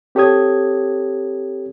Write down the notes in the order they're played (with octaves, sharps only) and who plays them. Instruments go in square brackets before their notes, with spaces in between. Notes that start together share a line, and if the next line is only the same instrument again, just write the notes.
[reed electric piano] C4 G4 A4 C#5 D#6 G#6